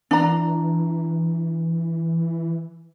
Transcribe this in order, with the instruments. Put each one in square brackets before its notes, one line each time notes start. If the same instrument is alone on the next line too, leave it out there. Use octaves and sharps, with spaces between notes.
[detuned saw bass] E3 [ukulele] D4 A#5